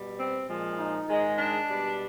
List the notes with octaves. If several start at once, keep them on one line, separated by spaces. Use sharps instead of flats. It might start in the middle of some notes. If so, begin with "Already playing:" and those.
Already playing: B2 G3
C4
A#2 F3 G#3
D#4
G#2 D#3 G#3
D4
B2 G3